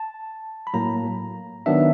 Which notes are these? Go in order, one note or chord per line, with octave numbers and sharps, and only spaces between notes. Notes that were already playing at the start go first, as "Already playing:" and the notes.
Already playing: A5
B5
A2 F#3 A#3 A#5
D#3 F#3 B3 D4 E5